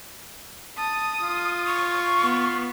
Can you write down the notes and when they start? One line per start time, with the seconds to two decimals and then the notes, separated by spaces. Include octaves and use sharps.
0.78 A5 D#6
1.22 F4
1.66 C#6
2.23 B3